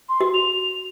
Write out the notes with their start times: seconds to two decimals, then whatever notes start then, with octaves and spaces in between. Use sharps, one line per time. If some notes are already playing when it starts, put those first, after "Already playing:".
0.09 C6
0.21 F#4
0.34 F7